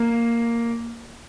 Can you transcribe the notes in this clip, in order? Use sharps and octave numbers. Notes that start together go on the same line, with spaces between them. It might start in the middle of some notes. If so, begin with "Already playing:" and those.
Already playing: A#3